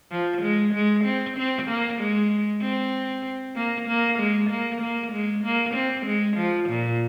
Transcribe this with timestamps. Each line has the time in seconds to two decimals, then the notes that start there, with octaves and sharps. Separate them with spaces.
0.12 F3
0.42 G#3
0.74 G#3
1.05 C4
1.37 C4
1.68 A#3
2.00 G#3
2.62 C4
3.56 A#3
3.88 A#3
4.19 G#3
4.50 A#3
4.82 A#3
5.12 G#3
5.44 A#3
5.75 C4
6.06 G#3
6.37 F3
6.70 A#2